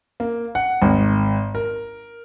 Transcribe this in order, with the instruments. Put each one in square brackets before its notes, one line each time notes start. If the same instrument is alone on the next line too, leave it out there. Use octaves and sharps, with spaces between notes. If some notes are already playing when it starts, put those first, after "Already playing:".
[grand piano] A#3
F#5
G#1
A#4